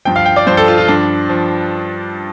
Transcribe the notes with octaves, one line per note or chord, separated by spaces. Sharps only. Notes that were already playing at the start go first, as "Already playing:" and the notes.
G2 F3 G5
F5
G5
D5
G2 F3 C5
A4
F4
F4
G2 F3 D4
F3